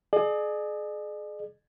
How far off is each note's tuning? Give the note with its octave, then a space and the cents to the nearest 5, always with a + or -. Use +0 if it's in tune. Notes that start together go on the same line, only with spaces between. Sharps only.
G#4 +30 D5 +45